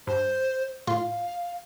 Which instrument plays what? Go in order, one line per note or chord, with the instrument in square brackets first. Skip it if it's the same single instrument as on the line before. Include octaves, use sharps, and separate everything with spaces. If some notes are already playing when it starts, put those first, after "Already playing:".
[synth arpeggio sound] G2 [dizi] C5
[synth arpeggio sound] A2 F4 C6 [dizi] F5